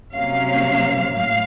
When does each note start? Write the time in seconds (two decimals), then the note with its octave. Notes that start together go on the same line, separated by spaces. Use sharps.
0.14 C3 F#3 A#3 C#4 F5
1.15 A2 F5